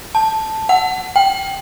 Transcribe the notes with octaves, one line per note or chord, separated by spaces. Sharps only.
A5
F#5
G5